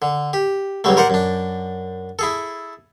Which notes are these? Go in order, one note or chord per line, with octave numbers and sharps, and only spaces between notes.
D3
G4
C#2 A2 F#3 G3 A3
A#4 C5 D5 F#5
F#2 D4
E4 G#4 A4